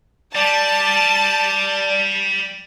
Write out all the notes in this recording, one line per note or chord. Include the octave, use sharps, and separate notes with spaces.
G3 D5 A5